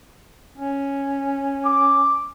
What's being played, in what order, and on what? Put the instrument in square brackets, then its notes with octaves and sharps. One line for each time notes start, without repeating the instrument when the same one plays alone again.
[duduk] C#4
[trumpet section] D6